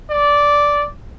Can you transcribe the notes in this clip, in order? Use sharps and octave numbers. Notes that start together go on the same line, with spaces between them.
D5